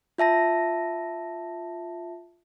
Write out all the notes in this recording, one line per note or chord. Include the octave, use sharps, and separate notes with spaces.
F4 E5 A5 A#6